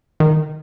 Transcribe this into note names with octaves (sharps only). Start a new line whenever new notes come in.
D#3